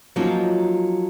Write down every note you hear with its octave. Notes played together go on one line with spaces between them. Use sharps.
F3 F#3 A#3 C#4 D#4 F4